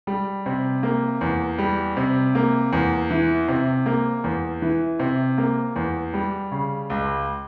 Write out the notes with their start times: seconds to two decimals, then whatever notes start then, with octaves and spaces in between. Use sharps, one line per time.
0.07 G3
0.46 C3
0.83 A#3
1.21 E2
1.58 G3
1.97 C3
2.35 A#3
2.73 E2
3.10 E3
3.48 C3
3.86 A#3
4.24 E2
4.62 E3
4.99 C3
5.38 A#3
5.76 E2
6.14 G3
6.52 C#3
6.90 C#2